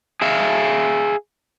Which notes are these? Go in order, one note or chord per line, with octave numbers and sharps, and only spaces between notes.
G#4 E5 F5